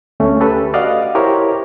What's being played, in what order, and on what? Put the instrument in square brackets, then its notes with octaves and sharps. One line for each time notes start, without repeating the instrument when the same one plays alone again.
[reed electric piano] D2 A3 C#4
G4 A4 B4
F#4 D5 D#5 F5 F#5
E4 G4 A#4 C5 C#5